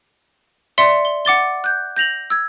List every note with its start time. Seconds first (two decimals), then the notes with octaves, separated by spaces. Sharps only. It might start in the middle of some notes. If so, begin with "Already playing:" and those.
0.78 D5 E5 C6 C#7 G7
1.05 G7
1.25 F#5 D6 A6 G7
1.64 F#6 G6
1.97 G6 A#6 F7 F#7
2.30 E6 G#6